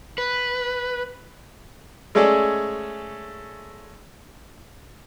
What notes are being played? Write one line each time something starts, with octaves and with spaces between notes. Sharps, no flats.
B4
G#3 A3 C#4 G#4 A4 D5